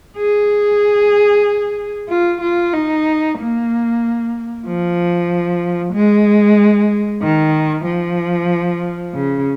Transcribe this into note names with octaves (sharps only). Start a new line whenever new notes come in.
G#4
F4
F4
D#4
A#3
F3
G#3
D#3
F3
C#3